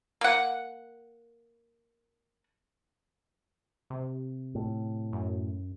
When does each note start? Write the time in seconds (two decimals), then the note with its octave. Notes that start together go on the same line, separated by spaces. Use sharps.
0.21 A#3 F#5
3.90 C3
4.55 A2
5.13 F#2